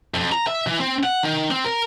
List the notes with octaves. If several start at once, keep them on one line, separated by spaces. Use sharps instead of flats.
F2
A#5
E5
E3
C4
F#5
D#3
C4
A#4